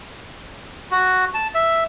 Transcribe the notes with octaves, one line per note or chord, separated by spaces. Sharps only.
F#4
A5
E5